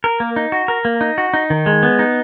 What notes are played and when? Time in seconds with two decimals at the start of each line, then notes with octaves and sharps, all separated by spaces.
0.04 A#4
0.20 A#3
0.36 D#4
0.52 F#4
0.68 A#4
0.85 A#3
1.01 D#4
1.18 F#4
1.34 D#4
1.50 D#3
1.66 G#3
1.83 B3
1.99 D#4